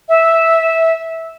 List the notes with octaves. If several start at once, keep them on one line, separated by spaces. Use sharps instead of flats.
E5